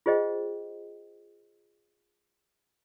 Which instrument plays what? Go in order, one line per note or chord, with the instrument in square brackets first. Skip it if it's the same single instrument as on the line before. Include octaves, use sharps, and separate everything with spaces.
[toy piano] F4 G#4 C5 D#5 G5